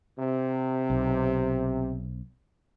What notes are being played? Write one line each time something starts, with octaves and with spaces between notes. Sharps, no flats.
C3
B1